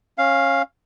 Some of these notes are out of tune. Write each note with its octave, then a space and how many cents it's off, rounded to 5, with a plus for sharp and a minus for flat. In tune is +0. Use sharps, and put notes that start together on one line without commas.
C#4 -20 F5 +0